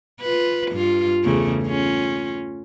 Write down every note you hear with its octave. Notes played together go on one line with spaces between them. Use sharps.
F4 B4
G2 F4
E2 C#3 A3
C#4 F4